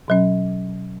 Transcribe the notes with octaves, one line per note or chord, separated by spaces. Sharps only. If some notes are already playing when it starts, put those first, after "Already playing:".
B2 F#3 C#4